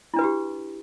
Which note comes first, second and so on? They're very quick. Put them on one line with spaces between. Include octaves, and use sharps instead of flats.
E4 D4 B4 F#4 G4